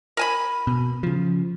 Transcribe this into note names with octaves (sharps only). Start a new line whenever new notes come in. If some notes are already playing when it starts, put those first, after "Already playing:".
A#4 G#5 B5
B2
C#3 F3